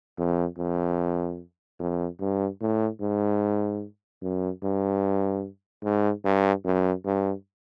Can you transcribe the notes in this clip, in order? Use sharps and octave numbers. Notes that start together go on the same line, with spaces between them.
F2
F2
F2
G2
A2
G#2
F#2
G2
G#2
G2
F#2
G2